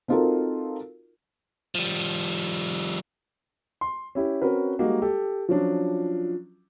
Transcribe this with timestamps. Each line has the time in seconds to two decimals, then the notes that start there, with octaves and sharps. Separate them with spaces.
0.08 C4 D#4 F4 F#4 A4 A#4
1.75 F3 G3
3.81 C6
4.15 C#4 E4 G4
4.42 C4 C#4 F#4 A#4 B4
4.79 G3 G#3 A#3 D#4 F#4
5.02 G4 A4
5.49 F3 F#3 C#4 D4